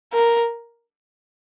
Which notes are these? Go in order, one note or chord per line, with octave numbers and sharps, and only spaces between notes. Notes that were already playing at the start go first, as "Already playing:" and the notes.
A#4